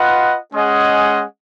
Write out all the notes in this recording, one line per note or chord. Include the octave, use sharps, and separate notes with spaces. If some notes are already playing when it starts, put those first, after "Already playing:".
Already playing: F4 B4 D#5 F#5
G#3 C#4 G#4 D#5 F#5